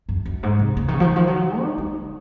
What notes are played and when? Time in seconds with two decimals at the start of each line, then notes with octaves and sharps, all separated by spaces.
0.09 F#2
0.25 F#2
0.43 G#2
0.59 C3
0.77 C#3
0.88 D#3
0.93 C#3
1.00 F3
1.04 D#3
1.16 F3
1.28 F#3
1.62 D#4
1.78 G#3
1.95 C#3